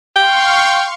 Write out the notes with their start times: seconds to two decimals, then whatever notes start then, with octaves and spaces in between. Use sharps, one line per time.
0.16 F5 G5 C6 C#6